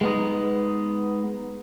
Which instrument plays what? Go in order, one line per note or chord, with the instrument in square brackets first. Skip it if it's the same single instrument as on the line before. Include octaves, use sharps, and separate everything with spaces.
[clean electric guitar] G#3 B3 D#4